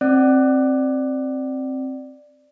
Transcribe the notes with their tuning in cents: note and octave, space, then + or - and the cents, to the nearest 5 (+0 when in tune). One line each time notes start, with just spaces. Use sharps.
C4 +15 D5 +10